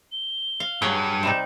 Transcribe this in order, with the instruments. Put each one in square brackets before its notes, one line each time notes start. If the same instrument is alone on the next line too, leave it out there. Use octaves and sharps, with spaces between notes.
[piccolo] G7
[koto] F5
[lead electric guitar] G2 [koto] F#3 G#4 C#5
[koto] C3 G3 D#4 [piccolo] E7